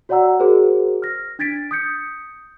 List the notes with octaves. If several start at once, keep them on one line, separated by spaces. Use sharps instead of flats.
F#4 C#5 D5 F#5 A#5 E6
F#4 G#4 A#4 C5
F6 A#6
D4 G#6 A6 B6 D7
D#6 G6 C#7